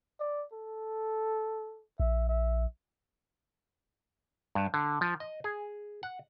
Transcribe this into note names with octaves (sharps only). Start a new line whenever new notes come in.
D5
A4
A#1 E5
E5
G2
D3
F3
D#5
G#4
F#5